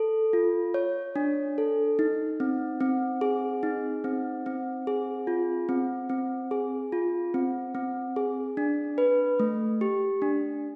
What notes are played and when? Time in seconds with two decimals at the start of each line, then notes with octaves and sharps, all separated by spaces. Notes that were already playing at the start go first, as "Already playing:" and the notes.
Already playing: A4
0.33 F4
0.74 C#5
1.16 D4
1.58 A4
1.99 D#4
2.40 C4
2.81 C4
3.21 G#4
3.63 D#4
4.04 C4
4.46 C4
4.87 G#4
5.27 F4
5.69 C4
6.10 C4
6.51 G#4
6.92 F4
7.34 C4
7.75 C4
8.16 G#4
8.57 D4
8.98 B4
9.40 A3
9.81 G4
10.22 D4